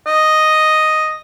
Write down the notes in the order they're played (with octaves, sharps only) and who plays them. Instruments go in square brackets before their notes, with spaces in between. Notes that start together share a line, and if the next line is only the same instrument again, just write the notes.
[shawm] D#5